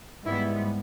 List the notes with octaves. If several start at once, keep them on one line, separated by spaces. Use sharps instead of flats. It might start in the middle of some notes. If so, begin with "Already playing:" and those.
G#2 G3 B3 E4